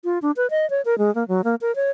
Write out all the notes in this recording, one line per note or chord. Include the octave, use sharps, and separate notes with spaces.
F4
D4
B4
D#5
C#5
A#4
G#3
A#3
F#3
A#3
A#4
C#5